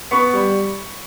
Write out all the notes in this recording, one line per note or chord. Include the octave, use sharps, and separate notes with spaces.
B3 B5 C#6
G3